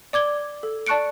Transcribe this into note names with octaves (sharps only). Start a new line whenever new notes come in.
D5 D6 G#6 G7
A4
D5 A5 C#6 F#6 C#7 D7